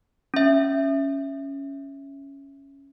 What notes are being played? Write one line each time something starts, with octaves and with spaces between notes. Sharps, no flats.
C#4 E5